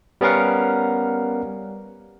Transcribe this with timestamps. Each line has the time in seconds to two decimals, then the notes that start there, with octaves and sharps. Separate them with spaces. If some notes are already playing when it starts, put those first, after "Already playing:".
0.21 G3 B3 C#4 A#4 F5 F#5